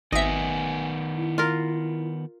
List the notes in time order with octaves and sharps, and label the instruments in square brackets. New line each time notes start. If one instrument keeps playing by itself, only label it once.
[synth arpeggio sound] G#1 E5 [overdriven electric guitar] D#3 B3 [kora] D#5 [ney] G#5
[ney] E4
[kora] F4 A#4